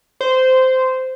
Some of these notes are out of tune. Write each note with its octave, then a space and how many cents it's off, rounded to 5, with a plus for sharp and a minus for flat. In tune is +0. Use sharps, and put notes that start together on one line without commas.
C5 -15